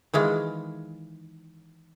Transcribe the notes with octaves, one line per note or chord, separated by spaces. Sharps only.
D#3 E3 G#3 F4